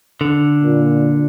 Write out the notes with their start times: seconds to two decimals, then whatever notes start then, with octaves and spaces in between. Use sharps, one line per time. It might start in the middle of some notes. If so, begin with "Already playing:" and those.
0.21 D3
0.64 A#2